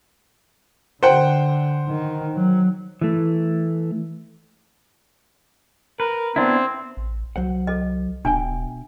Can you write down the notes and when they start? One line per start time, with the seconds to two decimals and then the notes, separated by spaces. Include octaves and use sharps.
1.03 D3 C5 F#5 G5
1.88 D#3
2.35 F#3
3.01 E3 A3
6.00 A#4 B4
6.36 B3 C4 D4 E4
6.97 A1
7.36 C2 F#3 C5 F#5
7.67 A4 D#5
8.25 D1 B2 D4 E5 G5 G#5